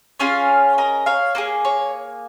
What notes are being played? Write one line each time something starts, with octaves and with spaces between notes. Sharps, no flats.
C#4 F4 G#4 C#5 F5
A#4 D#5
C#5 F5
A#3 D#4 G#4
C#5